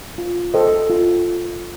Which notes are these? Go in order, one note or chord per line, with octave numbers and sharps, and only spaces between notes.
F4
A4 C5 D#5 G5
F4